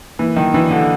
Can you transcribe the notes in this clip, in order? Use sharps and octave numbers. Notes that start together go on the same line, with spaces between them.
E3 A#3
D#3 F#3
E3 D4
D3 D4
D3